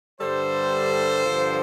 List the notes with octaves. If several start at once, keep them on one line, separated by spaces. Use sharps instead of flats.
G2 D3 G3 A4 C5
G2 D3 F3